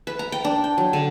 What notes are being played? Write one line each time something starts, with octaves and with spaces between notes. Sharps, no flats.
B4
A#5
G5
D4
G5
F#3
D3